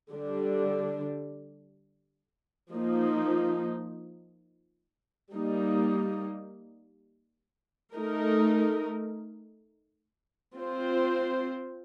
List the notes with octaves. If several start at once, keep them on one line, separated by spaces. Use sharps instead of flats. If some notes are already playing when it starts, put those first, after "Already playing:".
D3 G3 D4
F3 A#3 D#4
G3 A#3 D#4
A3 D#4 A#4
C4 F4 C5